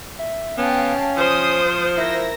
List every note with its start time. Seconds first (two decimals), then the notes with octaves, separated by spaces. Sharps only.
0.19 E5
0.58 B3 C#4 F5 G5 A5
1.17 F3 C5 C6 D#6
1.97 E4 A#4 E6 A#6